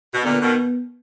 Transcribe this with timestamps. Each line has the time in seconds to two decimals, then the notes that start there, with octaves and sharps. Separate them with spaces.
0.14 B2
0.24 A#2 D3 B3
0.42 B2 D#3